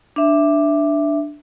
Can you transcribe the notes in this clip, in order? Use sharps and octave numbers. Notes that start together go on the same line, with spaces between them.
D4 E5